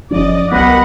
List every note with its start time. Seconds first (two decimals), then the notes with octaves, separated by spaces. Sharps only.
0.11 F#1 F3 C#4 D5 D#5
0.52 C2 F#3 B3 G4 A#4 B4 D#5 F#5